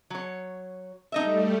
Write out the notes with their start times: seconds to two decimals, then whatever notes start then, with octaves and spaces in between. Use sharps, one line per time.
0.10 F#3 C#5
1.12 G3 A3 D#4 D#5 E5